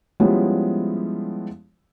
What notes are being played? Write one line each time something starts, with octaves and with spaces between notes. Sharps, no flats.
F3 G3 G#3 B3 C#4 E4